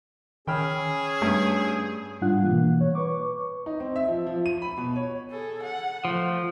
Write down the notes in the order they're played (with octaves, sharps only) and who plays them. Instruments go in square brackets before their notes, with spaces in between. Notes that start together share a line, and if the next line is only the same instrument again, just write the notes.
[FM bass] D#3 [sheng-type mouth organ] C#4 E6 [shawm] G#4 [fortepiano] G5 B5 F6
[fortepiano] G2 [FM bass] A3
[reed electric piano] G#2 G3 D4 F4 F#5 F#6
B2 E3 A#3
C#5
B4 C#6 D6
[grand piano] D#4
C4
E5
F3
F3
D#7
B5
B2
C#5
[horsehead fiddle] G#4 A4
F#5
[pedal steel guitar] F3 [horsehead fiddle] A3